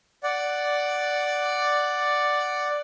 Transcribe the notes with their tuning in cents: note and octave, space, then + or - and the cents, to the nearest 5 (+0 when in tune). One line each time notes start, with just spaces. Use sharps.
D5 +0 F#5 +0